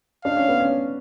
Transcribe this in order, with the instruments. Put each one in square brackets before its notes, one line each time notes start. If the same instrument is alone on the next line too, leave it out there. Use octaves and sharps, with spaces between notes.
[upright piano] D4 [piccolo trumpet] F5
[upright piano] C#4
B3
C#4